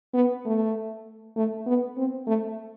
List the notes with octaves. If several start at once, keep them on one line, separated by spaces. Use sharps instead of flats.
B3
A3
A3
B3
C4
A3